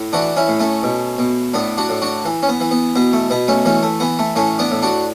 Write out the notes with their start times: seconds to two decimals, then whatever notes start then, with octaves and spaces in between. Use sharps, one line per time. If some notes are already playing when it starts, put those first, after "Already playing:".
Already playing: A2
0.13 E3 D4 F#4
0.37 C#4 E4
0.48 A2
0.60 A3 C#4
0.83 B2
1.18 B2
1.54 A2 B3 D4
1.78 D4 F#4
1.89 A2
2.02 D4 F#4
2.25 E3
2.43 C#4
2.49 B3
2.60 E3
2.71 B3
2.96 B2 B3
3.13 A3
3.30 B2 B3
3.48 A3 C#4
3.65 E3 A3 C#4
3.83 A3
4.00 E3 B3
4.19 A3
4.36 A2 A3 C#4
4.59 B3 D4
4.71 A2
4.82 D4 F#4